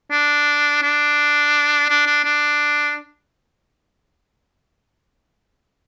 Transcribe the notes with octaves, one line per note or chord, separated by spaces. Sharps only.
D4
D4
D4
D4
D4